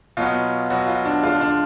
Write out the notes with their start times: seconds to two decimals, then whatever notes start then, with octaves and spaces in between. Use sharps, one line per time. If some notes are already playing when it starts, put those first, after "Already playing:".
0.17 B2 F#3 B3 F4
0.70 B2 F#3 B3 F#4
0.88 F4
1.05 D4
1.23 D3 G#3 D4 F4
1.41 D4